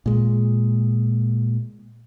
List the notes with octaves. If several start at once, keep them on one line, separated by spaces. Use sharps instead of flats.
A#2 G#3